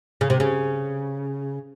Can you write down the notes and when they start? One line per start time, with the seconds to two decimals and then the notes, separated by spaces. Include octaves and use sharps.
0.21 C#3
0.30 C3
0.40 C#3